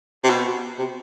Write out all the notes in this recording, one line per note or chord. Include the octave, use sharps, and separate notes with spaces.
C3
B2
C3